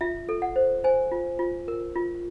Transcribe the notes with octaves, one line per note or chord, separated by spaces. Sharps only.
F4 E5
A4
F#5
C5
C5 G#5
F4
F4
A#4
F4